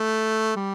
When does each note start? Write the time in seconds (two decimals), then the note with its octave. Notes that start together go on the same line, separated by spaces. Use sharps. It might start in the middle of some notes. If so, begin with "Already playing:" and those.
Already playing: A3
0.56 G3